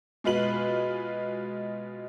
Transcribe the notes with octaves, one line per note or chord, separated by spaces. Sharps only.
B2 G#3 F4 B4 F#7